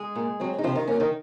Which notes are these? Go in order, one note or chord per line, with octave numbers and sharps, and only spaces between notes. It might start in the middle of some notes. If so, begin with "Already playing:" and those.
Already playing: G#3 G#4
A#2
F#3 C4
D#4
C3 F3 F4
D#3 D#4
F#3 A#3 C#4
D#3 D#4